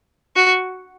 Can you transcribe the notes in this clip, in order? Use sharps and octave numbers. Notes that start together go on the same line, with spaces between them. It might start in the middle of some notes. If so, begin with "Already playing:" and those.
F#4